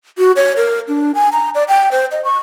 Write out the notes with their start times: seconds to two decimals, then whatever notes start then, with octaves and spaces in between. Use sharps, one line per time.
0.18 F#4
0.36 C#5
0.57 A#4
0.88 D4
1.15 G#5
1.32 A#5
1.55 D5
1.68 G5
1.91 C5
2.11 D#5
2.24 C#6